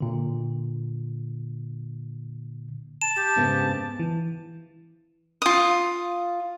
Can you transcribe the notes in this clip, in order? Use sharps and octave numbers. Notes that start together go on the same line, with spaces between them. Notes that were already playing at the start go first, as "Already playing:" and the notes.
A#2 D3
A5 E7
G4
G#2 C#3 B3
E3
F4 D#6